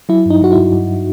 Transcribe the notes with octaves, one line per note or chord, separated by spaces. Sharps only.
F#3 E4
G2 D#4
F#3 F#4
G2 E4
G2